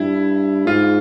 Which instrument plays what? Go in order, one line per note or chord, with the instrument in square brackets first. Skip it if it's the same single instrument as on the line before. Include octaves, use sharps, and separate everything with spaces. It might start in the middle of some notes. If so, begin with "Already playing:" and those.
Already playing: [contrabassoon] G2 [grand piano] E4
[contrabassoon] G#2 [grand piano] F4